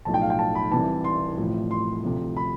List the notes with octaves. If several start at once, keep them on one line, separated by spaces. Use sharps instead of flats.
B1 A2 F3 A5
G5
F5
G5
A5
B5
C2 C3 E3 A5
C6
A1 A2 F3
C6
D2 C3 F3
B5